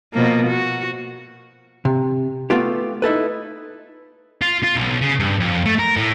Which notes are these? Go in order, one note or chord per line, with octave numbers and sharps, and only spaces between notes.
B2 F3 A#3
F#4
C3
A3 B3 F4 G4
D#4 E4 A4 B4
F4
F4
B1
C#3
G2
F2
A3
A#4
A2